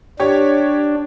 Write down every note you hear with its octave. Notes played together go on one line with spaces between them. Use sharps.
D4 G4 C#5